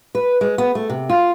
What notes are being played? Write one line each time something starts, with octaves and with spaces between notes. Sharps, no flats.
B4
G#3
B3
A3
C3
F4